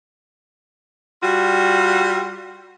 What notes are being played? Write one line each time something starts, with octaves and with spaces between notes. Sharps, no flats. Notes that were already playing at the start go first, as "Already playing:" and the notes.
G3 F4 F#4